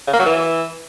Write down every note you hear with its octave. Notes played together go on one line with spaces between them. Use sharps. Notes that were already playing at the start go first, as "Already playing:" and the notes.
C#3
A#3
F#3
E3